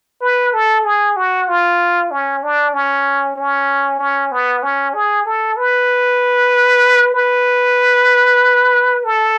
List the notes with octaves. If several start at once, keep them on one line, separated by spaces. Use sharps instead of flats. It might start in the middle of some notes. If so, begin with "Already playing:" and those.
B4
A4
G#4
F#4
F4
C#4
D4
C#4
C#4
C#4
B3
C#4
G#4
A4
B4
B4
A4